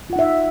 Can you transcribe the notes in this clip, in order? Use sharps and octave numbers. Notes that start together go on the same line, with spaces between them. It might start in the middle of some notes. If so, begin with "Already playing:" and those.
D#4 F4 E5 F#5